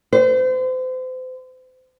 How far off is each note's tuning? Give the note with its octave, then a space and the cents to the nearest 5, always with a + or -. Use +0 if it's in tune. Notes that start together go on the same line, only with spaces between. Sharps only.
C5 -35